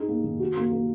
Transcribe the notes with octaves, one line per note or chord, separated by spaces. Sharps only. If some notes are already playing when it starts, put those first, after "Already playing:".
Already playing: D#4 G#4
A#3
D#3
F#4
A#3
A#3